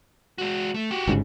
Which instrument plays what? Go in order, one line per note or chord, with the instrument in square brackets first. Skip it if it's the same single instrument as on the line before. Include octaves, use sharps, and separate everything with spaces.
[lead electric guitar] G#3 F#4
A3
F#4 G4
[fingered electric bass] G1 G#2 C#3